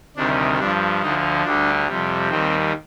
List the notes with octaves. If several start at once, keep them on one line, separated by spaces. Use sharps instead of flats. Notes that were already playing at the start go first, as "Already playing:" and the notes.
D2 C3 D#3 G3 D4
G2 F3 D4
D2 D3 F3 D#4
D2 D3 G3 D4
F2 C3 G3
D#2 D#3 G3 C4